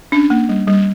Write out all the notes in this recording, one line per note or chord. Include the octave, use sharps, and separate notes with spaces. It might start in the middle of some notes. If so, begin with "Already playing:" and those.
C#4 D4
A#3
G3
G3